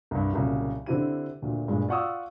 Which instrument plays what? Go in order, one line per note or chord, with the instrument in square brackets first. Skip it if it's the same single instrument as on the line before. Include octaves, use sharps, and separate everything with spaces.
[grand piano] C2 G2
C2 A#2 C#3 F#3
D3 C4 E4 G4 D#7
D2 A#2
G2 A#2 G#3
F4 D5 F#5 C#6 D#6 E6